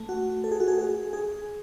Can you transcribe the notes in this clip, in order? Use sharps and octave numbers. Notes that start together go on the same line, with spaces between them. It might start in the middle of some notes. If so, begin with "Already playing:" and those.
Already playing: A3
F#4
A4
G#4
F#4
G#4
G#4
G#4